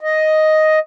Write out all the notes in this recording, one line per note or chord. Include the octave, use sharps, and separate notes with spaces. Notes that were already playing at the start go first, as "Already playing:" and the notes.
D#5